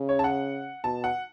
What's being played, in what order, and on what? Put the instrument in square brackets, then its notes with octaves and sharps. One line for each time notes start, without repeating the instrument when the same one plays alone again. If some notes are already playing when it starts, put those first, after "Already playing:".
Already playing: [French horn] C#3
[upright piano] C#5
A5
F#5
[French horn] B2 [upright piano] A5
[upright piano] F#5